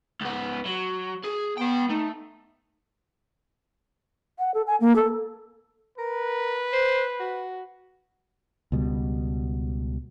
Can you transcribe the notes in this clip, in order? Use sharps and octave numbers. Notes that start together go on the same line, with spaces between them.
C#2 B3
F#3
G#4
B3 B4 G5
A3 D#4
F#5
A4
G#5
A#3
A4
A#4 B4
C5
F#4
C#2 B2 G3